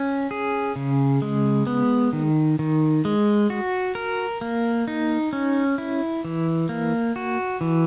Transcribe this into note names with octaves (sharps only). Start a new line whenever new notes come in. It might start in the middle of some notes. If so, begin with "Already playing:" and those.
Already playing: C#4
G#4
C#3
G#3
B3
D#3
D#3
G#3
F#4
A#4
A#3
D#4
C#4
E4
E3
A#3
F#4
E3